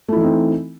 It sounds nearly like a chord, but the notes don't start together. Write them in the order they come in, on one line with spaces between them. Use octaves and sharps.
A3 E4 E3 D#4 C4